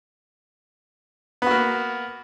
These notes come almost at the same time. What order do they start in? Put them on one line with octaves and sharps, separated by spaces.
B3 F#4 A#3